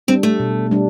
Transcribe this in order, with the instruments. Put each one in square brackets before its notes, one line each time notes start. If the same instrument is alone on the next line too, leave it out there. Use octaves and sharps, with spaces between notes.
[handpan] G3 D4 [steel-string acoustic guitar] C4
[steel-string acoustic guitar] A3
[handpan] B2
G3 D4